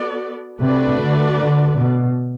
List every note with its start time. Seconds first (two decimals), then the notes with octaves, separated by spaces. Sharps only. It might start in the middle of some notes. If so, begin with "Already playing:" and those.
Already playing: B3 F#4 A4 D5
0.60 C3 A3 D4 F#4 B4 D5
1.00 D3
1.39 D3
1.78 B2